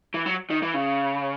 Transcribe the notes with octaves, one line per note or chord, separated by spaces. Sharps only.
E3
F#3
D#3
E3
C#3